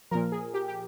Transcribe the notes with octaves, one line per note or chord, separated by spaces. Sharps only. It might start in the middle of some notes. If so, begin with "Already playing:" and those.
A#2 F3 A#4
G#4
G4
G4